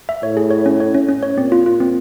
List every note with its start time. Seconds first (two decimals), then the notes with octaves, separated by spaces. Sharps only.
0.09 E5
0.23 A2 C#5
0.37 G#4
0.51 C#5
0.66 C#4
0.80 C#5
0.94 C#4
1.09 C#4
1.23 C#5
1.37 A#2 C4
1.52 F4
1.66 F4
1.80 C4